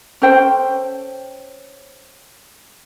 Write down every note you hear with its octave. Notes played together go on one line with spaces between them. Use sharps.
C#4 A4 C5 G5